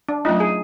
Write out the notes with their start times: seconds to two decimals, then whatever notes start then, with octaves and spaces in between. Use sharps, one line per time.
0.09 D4
0.25 F#3 A3 C#4 D#4 F4
0.40 G#4